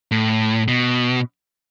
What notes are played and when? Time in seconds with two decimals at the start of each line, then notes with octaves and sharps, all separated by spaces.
0.11 A2
0.68 B2